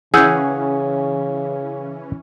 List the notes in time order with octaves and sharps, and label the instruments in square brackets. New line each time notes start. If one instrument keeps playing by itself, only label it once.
[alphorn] C#3 [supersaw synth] E3 C#4 [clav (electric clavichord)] G#4 F#5 [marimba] E6 G6